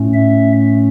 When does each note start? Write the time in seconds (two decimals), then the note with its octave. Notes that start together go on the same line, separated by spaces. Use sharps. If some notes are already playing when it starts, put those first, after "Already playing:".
Already playing: A2 A3 C#4
0.14 E5